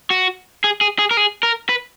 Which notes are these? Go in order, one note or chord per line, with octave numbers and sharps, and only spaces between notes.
F#4
G#4
G#4
G#4
A#4
G#4
A#4
B4